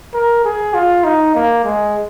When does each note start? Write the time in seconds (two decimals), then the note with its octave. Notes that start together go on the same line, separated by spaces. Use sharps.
0.14 A#4
0.44 G#4
0.74 F4
1.04 D#4
1.34 A#3
1.64 G#3